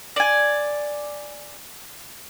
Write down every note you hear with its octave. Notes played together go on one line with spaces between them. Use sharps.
D5 G#5